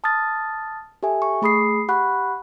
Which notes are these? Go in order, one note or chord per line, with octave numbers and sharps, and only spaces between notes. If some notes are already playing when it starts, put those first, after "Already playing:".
A5 D#6 F6 A6
G4 A4 E5 G#5
C#6
A3 G#4 B5 D#6 C7
G4 F#5 B5 C#6 F#6